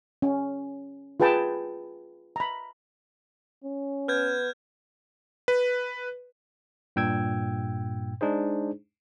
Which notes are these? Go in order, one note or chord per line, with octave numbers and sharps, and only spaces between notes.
C#4
F4 G#4 B4 G5 A5
A#5 B5
C#4
B3 F6 G6 G#6
B4
G2 A#2 G5 E6 G#6
G#3 D4 D#4 G#4 C5